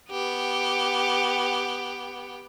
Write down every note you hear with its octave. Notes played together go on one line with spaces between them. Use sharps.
B3 G4